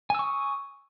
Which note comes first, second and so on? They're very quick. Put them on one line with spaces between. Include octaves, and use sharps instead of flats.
G#5 E6 C#6 D#6